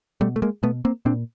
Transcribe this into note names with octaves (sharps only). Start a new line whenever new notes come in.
B2 G3 A3
A3
G#3 A#3
B2 A3 B3
A#3 C4
A#2 C4 D4